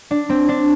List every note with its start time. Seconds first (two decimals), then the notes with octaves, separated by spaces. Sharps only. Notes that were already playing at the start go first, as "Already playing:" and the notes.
0.11 D4
0.29 C4
0.49 D4